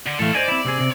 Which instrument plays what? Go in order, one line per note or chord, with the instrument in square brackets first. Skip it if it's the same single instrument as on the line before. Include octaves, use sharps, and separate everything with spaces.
[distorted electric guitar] D3
[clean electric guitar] A2 E3 A3 [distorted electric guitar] A4 F5
[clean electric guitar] C5 D#5 G#5 [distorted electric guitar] D5
[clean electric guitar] C4 E4
C3 C4 G#4
C3 C4